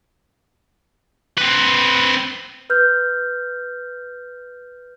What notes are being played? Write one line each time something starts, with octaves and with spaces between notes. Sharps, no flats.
C4 B4
B4 F6 G6